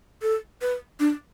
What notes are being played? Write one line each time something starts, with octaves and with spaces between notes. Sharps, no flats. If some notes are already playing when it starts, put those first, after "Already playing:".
A4
B4
D4